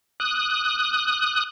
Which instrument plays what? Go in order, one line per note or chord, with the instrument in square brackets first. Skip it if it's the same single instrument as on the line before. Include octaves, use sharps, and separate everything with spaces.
[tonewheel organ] D#6 F#6